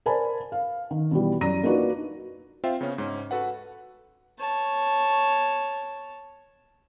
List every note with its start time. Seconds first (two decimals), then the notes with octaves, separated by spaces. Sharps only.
0.06 A#4 C5 D5 G#5 A5 B5
0.52 F5
0.91 D#3
1.11 B2 E3 G3
1.41 F#2 D5 A#5 A#6 D#7
1.63 A#3 D4 D#4 F4 F#4 B4
2.64 C4 F4 C5 E5 G5
2.81 C#3 B3 C#4
2.98 G#2 C#4
3.31 F#4 A4 B4 F#5
4.39 C#5 A5